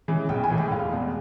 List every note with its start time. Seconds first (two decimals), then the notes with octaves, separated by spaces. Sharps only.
0.08 E3 G#3 C#4
0.29 B1 G5
0.44 G#5
0.50 A2 E3 G#3
0.58 G5
0.71 F1 F5
0.93 E2 B2 G#3